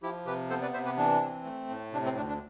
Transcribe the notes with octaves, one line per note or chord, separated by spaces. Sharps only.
F3 E4 G4
C3 G4 B4
B3 A4 C5
B4 D5
C3 C5 E5
G4 B4
E3 D4
C4
A3
A2
C3 D4
C4
D2 D4
D4